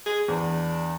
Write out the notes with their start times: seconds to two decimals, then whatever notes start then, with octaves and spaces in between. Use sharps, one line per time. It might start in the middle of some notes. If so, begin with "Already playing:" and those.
0.06 G#4
0.28 E2 D4